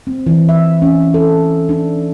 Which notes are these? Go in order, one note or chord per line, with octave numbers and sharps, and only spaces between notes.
C4
E3
E5
C#4
A4
D4